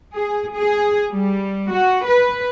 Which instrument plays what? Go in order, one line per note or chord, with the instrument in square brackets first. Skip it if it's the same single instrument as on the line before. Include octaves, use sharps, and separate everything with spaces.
[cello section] G#4
G#4
G3
F#4
B4